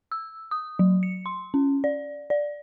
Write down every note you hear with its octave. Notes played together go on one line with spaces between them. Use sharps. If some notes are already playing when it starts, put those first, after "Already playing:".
E6
D#6
F#3
C#7
C6
C#4
D5
D5